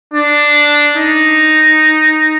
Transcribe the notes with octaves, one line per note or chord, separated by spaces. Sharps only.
D4
D#4